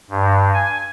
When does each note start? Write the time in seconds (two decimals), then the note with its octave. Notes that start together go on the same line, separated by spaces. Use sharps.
0.10 G2
0.54 G#5